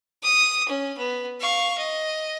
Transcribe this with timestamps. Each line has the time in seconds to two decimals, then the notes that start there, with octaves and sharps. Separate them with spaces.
0.23 D#6
0.68 C#4
0.98 B3
1.41 F5 C#6
1.78 D#5